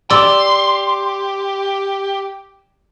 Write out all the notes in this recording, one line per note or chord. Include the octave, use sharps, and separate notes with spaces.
G4 D5 C6 E6